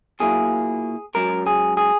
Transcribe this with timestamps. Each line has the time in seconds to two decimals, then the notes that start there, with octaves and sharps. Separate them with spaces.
0.20 B1 A#2 F#3 A#3 E4 G#4
1.14 G#2 F#3 C#4 A#4
1.47 G#4
1.77 G#4